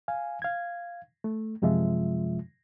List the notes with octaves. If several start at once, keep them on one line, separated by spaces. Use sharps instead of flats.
F5 G#5
F5 G#6
A3
F#2 C3 F3 G#3 F4 E5